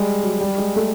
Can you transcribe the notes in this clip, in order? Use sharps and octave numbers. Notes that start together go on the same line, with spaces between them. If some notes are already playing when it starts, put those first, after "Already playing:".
Already playing: G3 G#3
F#3
G3
G#3
A3